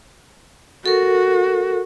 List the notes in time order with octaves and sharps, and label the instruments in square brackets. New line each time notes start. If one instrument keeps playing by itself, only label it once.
[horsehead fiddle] F#4 [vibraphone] A4 A#4